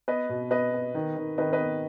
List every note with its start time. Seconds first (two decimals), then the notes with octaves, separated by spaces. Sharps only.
0.08 B3 B4 D#5
0.30 B2
0.51 B3 B4 D#5
0.74 B3
0.95 D#3
1.17 D#3
1.38 D#3 B4 D#5
1.53 B4 D#5
1.60 B3